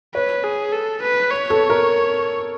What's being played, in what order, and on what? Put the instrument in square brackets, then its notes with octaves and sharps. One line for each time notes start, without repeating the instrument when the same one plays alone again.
[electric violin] B4 [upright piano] C#5
[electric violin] G#4
A4
B4
C#5
[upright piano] A4
A#4